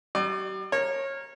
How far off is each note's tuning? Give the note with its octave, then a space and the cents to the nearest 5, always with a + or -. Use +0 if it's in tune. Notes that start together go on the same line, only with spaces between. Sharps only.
G3 -45 D5 +35
A#4 +0 C#5 -25